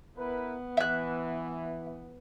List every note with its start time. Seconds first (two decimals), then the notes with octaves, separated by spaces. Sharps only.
0.17 B3 E4 A#4 B4
0.77 E3 E5 F#6